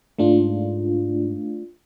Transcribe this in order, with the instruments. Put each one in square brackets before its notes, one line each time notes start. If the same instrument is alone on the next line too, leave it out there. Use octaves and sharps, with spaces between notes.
[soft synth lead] G#2 [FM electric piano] A3 D4 F4